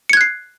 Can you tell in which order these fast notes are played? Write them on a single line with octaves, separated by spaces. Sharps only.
C#7 G#6 F#6 C7